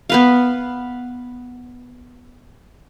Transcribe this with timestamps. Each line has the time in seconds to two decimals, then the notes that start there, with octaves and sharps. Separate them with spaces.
0.09 B3 B4 F5